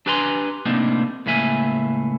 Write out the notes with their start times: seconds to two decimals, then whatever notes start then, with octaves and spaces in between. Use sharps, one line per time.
0.06 D4 G4 B4 G#5 A#5 C6
0.66 A2 C3 A#3 C4 D4 D#4
1.26 C#2 A2 A#3 E5 G#5